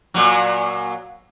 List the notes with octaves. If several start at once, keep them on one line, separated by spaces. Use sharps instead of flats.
A#2 F#3